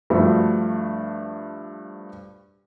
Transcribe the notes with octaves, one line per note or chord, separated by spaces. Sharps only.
G2 F3 A3 F#4